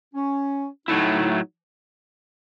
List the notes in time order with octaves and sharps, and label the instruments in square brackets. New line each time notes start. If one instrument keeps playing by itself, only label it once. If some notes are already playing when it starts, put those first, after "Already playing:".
[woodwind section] C#4
[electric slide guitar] A2 F#3 A3 E4 [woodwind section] D#4